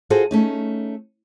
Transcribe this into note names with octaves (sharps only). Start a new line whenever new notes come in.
F4 F#4 G#4 A4 C5
A3 C#4 D#4